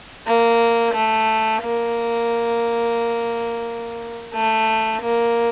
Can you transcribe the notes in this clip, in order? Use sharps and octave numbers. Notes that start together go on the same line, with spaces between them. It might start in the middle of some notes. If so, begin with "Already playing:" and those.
A#3
A3
A#3
A3
A#3